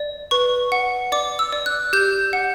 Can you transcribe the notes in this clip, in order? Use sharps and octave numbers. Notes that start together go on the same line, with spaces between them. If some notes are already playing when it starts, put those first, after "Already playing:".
Already playing: D5
B4 C#6
F#5
D5 D6
E6
D5
F#6
G4 G6
F#5